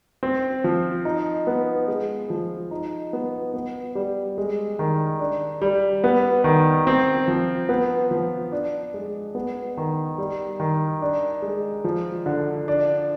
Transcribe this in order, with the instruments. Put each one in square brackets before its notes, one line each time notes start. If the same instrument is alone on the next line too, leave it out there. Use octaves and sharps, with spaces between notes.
[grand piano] C4
F3
D#4
B3
G#3
F3
D#4
B3
B3
G3
G#3
D#3
D4
G3
B3
D#3
C4
F3
B3
F3
D4
G#3
B3
D#3
G3
D#3
D4
G#3
F3
D3
D4